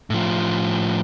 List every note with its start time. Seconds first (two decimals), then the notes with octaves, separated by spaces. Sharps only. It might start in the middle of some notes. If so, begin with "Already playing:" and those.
0.10 A2 F3